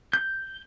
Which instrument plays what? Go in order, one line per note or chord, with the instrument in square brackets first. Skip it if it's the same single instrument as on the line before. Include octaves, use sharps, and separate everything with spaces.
[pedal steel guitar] G6